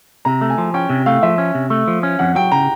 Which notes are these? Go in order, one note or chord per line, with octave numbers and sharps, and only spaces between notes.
C3 A#5
A3
G#5
F3
C#4 G5
C3
A3 F5
F3 E5
C#4
C3
A3
F3
C#4
F2 F#5
F#3 G5
C#3 A#5